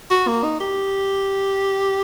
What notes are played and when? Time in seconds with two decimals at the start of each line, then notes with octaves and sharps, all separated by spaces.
0.11 F#4
0.28 A#3
0.44 D#4
0.60 G4